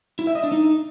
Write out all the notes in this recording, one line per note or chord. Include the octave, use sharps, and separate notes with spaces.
E4
E5
D#5
D4
D#4